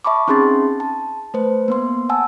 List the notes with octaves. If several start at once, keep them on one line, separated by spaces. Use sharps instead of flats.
E5 A5 B5 C#6 D6
C4 C#4 D#4 G#4 C6 A6
A5
A3 B4 C5
A#3 B3 C6
F#5 G#5 A5 E6